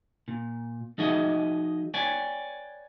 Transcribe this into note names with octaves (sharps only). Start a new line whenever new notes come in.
A#2
F3 D#4 F#4 G#4 D#5 E5
B4 C#5 D5 G5 G#5